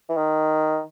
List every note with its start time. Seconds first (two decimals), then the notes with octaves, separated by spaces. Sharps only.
0.09 E3
0.17 D#3